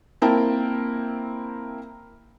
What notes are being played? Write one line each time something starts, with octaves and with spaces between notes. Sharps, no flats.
A#3 C4 E4 A#4 G5 A5